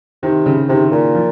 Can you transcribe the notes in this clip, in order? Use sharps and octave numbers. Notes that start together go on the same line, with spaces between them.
C3 D#3
C#3
C3 D#3
A#2
F3